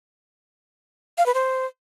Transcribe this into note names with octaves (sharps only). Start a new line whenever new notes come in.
F5
B4
C5